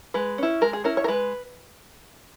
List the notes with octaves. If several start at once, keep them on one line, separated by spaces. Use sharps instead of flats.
G#3 B4
C#4 E4
G#3 A#4
G#4
C#4 E4 A#4
C#5
A#4
G#3 B4